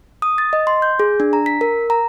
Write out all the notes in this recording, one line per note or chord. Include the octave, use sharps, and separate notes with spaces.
D#6
A6
D#5
C6
G6
G#4
D4
A#5
B6
A#4
A#5